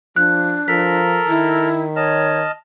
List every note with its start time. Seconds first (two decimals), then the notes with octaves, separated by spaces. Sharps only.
0.16 F3 D4 F#6
0.68 F3 A4 A#4 A#5 B6
1.28 D#3 E4
1.96 C#5 D#5 A5 F6